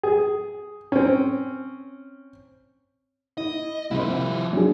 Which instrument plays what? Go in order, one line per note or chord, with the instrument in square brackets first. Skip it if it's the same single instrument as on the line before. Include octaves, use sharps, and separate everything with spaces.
[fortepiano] G#4
C4 C#4
[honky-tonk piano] E4 [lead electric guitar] D#5
[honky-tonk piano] C2 C4 [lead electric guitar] F3 E4
[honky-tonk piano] F#3 D4 G#4